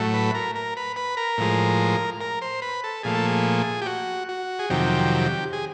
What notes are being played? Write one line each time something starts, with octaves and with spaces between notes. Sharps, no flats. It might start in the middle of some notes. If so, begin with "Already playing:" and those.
Already playing: A2 F#3 A3
B4
A#4
A#4
B4
B4
A#4
A2 F3 G#3
A#4
C5
B4
A4
A#2 F3 A3 G#4
A4
G#4
G4
F#4
F#4
G#4
F2 C3 D#3 F#3 G4
G#4